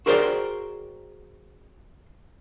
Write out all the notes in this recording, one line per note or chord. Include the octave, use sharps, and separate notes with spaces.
F#4 G#4 A#4 C5 D5 G5